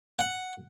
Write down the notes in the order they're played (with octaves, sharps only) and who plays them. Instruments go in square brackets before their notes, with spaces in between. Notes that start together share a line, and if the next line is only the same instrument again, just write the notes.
[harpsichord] F#5